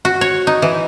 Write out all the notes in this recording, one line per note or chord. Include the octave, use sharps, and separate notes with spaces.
F#4
C#5
D#4
E3